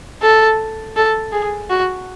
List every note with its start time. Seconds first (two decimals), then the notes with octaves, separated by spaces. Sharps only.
0.22 A4
0.96 A4
1.32 G#4
1.70 F#4